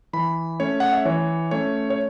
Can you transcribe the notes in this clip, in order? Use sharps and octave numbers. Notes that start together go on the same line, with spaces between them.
E3 B5
A3 C#4 C#5
F#5
E5
E3 C#5
A3 C#4 C#5
C#5